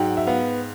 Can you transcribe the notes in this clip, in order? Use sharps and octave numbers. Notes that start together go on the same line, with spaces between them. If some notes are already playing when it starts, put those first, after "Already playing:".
Already playing: G#2 F#3 F#5 G5
E5
B3 F5